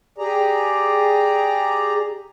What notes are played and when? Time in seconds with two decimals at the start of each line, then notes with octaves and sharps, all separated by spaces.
0.18 G4 G#4 D5 A#5